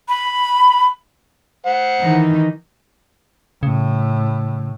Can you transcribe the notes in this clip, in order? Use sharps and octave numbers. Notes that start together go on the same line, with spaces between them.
B5
C5 F#5
D#3 E3 D#4
A2 C#3